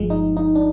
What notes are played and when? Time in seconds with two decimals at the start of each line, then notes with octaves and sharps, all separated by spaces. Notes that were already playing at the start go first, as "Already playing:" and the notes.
Already playing: G1 G2 F3 G#3
0.10 D#4
0.37 D#4
0.55 D4